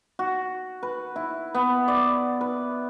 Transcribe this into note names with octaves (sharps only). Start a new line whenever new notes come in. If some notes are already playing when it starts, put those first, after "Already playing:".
F#4
B4
E4
B3
D5
B4